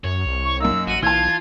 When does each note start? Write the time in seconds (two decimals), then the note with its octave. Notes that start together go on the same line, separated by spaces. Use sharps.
0.04 F#2 C#5
0.26 C2
0.45 C#6
0.60 F#2 A#3 D#4 E6
0.88 A1 F#4 D#7
1.03 B1 E3 F4 A5 G#6